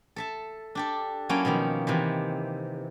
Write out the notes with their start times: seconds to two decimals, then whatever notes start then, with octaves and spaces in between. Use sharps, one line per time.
0.16 A4 E5 A5
0.75 D4 G4 A4
1.29 F#3 A#3 C#4 E4 A4 G5
1.45 B2 D#3 F3 A#3
1.87 C3 D#3 E3